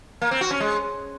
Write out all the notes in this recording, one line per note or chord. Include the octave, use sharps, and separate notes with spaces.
A#3
C4
F#4
C#4
G#3